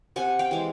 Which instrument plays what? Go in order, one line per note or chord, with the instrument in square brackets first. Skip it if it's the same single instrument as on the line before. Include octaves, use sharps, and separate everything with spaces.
[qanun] C3 F#5 G#5
F5 G5
E3 G#3